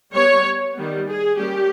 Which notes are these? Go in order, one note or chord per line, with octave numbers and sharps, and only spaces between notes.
G3 B3 C#5
D#3 G3 B3
G#4
G3 A#3 C#4 G4